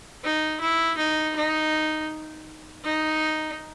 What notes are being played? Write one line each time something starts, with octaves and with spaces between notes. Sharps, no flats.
D#4
E4
D#4
D#4
D#4